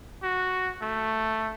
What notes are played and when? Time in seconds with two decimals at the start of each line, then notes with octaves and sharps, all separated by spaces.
0.23 F#4
0.82 A3